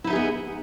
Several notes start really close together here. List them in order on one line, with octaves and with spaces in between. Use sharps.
E4 D#4 E5 G#4 B3